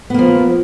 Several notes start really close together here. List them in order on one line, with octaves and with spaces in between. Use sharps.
B3 A#3 F3